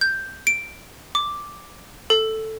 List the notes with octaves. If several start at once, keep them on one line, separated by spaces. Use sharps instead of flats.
G6
D7
D6
A4